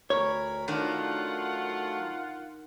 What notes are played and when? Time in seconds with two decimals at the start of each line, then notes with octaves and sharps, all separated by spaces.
0.10 D2 A#4 C#5 B5
0.68 D#3 F#3 A3 D4 F4 A#4 F#5